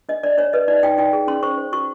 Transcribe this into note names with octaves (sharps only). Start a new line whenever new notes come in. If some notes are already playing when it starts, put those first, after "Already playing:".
D4 D#5
D4 D5
D4 C#5
B4 D#5
D#4 D5
D#4 G5
D#4 G5
G#4
C#4 C6
C5 C#6
C5
F#4 C#6